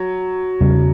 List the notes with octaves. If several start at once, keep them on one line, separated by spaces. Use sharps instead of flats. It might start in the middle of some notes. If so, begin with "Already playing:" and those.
Already playing: F#3
E2 C#3 G3 C#4